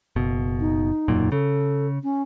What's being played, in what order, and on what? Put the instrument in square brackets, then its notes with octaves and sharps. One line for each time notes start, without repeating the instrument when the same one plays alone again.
[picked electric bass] F#1 B2
[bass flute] D#4
[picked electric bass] E1 F#2 A#2
[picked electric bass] C#3 [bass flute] A4
[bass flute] C#4